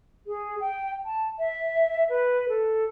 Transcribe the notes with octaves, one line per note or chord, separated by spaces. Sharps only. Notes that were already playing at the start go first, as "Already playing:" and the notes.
G#4
G5
A5
E5
B4
A4